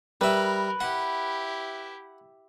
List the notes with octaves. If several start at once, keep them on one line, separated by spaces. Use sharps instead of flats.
G3 A#4 B4 E5
E4 G4 F#5